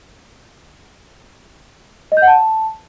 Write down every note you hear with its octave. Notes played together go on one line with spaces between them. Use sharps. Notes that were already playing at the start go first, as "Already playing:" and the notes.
D#5
G6
F#5
A5